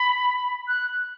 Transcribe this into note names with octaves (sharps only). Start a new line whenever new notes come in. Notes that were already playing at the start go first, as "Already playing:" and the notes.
Already playing: B5
F#6